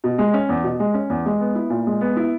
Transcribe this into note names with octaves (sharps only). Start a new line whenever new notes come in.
B2
G#3
C#4
E2
B2
G#3
C#4
E2
G#3
B3
E4
A#2
G#3
B3
E4